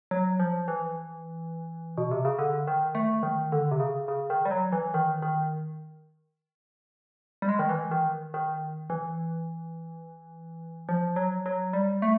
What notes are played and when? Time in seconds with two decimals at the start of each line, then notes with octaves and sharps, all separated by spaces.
0.11 F#3
0.40 F3
0.68 E3
1.98 B2
2.11 C3
2.25 C#3
2.39 D3
2.67 D#3
2.95 A3
3.23 D#3
3.52 D3
3.71 C3
3.80 C#3
4.08 C#3
4.30 D#3
4.45 G3
4.51 F#3
4.72 E3
4.94 D#3
5.22 D#3
7.42 G3
7.49 G#3
7.59 D#3
7.69 E3
7.91 D#3
8.34 D#3
8.90 E3
10.89 F3
11.16 F#3
11.46 F#3
11.73 G3
12.02 A3